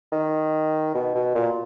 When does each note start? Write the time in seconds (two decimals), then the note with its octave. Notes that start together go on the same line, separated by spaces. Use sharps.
0.12 D#3
0.94 B2
1.15 B2
1.35 A#2